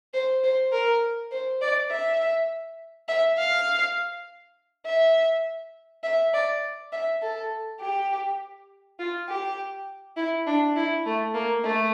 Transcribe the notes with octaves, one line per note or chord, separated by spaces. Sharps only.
C5
C5
A#4
C5
D5
E5
E5
F5
E5
E5
D5
E5
A4
G4
F4
G4
E4
D4
E4
A3
A#3
A3